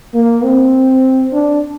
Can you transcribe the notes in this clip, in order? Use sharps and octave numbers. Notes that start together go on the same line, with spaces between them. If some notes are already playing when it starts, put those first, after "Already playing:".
A#3
C4
D4